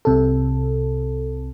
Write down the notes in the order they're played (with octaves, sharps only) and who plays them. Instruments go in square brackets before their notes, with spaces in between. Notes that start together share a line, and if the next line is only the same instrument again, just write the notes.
[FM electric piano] C2 C3 A4